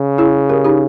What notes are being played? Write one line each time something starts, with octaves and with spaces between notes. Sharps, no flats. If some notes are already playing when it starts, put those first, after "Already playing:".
Already playing: C#3
E4 G#4
G4 A#4
D#4 G4